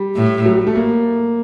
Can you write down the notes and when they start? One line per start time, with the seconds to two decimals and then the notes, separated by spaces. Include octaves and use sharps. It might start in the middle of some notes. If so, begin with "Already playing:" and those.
Already playing: G3
0.16 A2
0.46 F#3
0.56 G3
0.67 A3
0.76 A#3